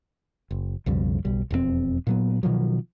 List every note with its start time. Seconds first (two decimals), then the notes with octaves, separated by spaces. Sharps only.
0.51 F#1
0.86 B1 F2 C#3 G3
1.25 F#1 B1 G3
1.50 E1 F2 F3 C4
2.07 A#2 F#3 B3
2.43 B2 D#3 F3 F#3